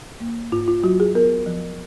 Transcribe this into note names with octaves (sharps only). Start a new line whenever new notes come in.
A#3
G#2 F4
F4
F#3 F#4
G#4
B3 A#4
F3